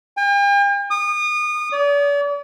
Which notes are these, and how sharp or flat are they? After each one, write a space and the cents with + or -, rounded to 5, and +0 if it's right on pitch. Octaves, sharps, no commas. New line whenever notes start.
G5 +45
D#6 -30
D5 -45